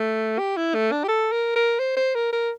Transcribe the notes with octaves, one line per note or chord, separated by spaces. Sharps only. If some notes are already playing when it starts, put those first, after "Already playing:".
Already playing: A3
G4
E4
A3
D4
G4
A4
A#4
A#4
C5
C5
A#4
A#4